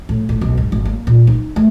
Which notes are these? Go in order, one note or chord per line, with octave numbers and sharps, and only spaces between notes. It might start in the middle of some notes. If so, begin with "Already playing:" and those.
A2
A2
B1
G#2
G#1
A#3
A#2
D#4
A3